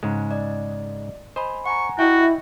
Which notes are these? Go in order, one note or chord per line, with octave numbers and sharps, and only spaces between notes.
G#2 C#3 G#3
D5 D#5
C5 D#5 G#5 B5
F#5 G#5 A#5 C#6
E4 F#4 D#5 E5 G5